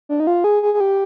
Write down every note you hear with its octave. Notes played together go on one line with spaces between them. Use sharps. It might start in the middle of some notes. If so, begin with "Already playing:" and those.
D4
D#4
F4
G#4
G#4
G#4
G4